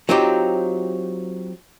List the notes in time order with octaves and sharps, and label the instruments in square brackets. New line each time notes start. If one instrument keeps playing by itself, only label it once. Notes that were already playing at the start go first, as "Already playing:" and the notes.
[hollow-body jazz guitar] F#3 C4 D#4 F4 G4